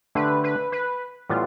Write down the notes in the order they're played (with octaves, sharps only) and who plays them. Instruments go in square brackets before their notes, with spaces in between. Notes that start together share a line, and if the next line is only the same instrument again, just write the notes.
[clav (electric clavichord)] D3 A3 D4 G4 [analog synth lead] B4
[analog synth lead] B4
B4
[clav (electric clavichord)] A2 E3 G3 B3 [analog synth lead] F4